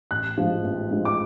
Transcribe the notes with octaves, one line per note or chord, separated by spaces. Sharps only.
A1 F#6
G#2 F3
A1
G#2 F3
D6